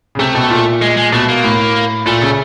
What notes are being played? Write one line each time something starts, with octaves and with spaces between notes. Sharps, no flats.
C#3
C3 A3
B2
A#2
G#3
G#3
B2 A3
A#3
A2
A#2 A3
C#3